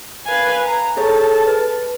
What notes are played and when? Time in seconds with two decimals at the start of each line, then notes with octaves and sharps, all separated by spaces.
0.25 B4 F5 G#5
0.66 A#5
0.97 G#4 A4 C#5 A5
1.47 B4